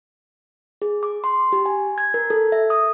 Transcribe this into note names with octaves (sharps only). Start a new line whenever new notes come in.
G#4
D6
C6
G4
G#5
G#6
A#4
A4
E5
D#6